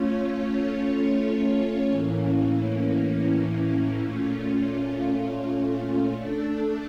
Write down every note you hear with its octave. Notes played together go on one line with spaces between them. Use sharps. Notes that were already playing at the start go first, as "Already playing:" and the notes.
Already playing: A3 C#4 F4 C#5
A2 E3 A#3 C#4
A#2 A3 C#4 F4
A3 D4 A4